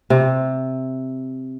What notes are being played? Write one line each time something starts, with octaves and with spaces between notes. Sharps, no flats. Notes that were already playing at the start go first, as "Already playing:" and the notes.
C3